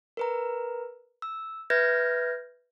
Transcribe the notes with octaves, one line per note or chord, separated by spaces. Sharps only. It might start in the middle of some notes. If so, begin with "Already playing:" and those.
A#4 B4 A#5
E6
B4 E5 F6 G6 G#6 A#6